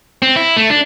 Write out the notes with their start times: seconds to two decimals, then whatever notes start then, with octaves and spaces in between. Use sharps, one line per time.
0.22 C4
0.36 E4
0.57 A3
0.70 D4